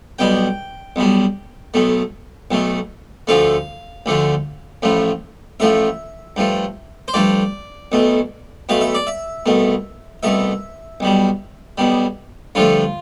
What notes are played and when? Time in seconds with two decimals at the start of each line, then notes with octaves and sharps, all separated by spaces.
0.19 B1 B2 G3 G5
0.96 B1 B2 G3
1.74 B1 B2 A3
2.51 B1 B2 A3
3.27 D2 D3 F3 A3 F5
4.06 D2 D3 F3 A3
4.82 A1 A2 F3 A3
5.60 A1 A2 F3 A3 E5
6.36 G2 F3 A3
7.08 C5
7.14 G2 F3 A3 D5
7.92 B1 B2 A3
8.69 B1 B2 A3 F5
8.81 E5
8.95 D5
9.07 E5
9.46 C2 B2 A3
10.23 C2 B2 A3 E5
11.00 B1 B2 G3
11.78 B1 B2 G3
12.55 G2 D3 F3 A3 F4